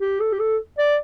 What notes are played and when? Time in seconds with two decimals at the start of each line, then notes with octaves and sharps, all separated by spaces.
0.01 G4
0.20 A4
0.32 G4
0.39 A4
0.78 D5